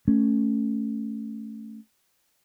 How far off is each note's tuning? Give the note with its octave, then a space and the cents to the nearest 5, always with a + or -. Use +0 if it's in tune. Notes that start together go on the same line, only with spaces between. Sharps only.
A3 +0 C#4 +0